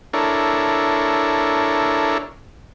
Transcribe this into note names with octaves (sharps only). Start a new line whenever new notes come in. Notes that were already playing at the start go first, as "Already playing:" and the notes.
D4 E4 A4 A#4 C#5